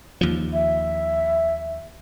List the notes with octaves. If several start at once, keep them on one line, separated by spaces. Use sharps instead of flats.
D#2 F3
E5